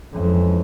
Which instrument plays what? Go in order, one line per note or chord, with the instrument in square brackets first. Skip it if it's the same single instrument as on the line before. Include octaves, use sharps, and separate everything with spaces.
[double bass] F2 [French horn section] E3 G#3 C#4